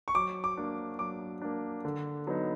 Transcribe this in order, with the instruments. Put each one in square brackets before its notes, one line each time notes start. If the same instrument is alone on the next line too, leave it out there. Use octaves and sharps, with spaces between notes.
[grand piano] C#6
F#3 D6
D6
A#3 D4
F#3 D6
A#3 D4
D3
F#3 B3 D#4